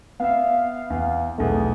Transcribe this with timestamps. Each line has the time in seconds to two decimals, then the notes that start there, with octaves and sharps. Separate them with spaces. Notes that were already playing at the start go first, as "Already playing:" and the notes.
0.20 B3 E5 F5
0.90 E2
1.38 B1 E2 A3 G#4